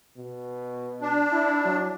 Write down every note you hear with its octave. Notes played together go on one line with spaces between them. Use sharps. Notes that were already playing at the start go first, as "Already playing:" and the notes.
B2
D4
E4
F#3